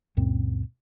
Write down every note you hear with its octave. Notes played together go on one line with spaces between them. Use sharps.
C#2 F#2 A#2 C4